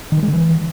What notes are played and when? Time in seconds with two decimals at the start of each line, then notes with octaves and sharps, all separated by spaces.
0.12 D#3
0.17 F3
0.23 G#3
0.28 D3
0.33 E3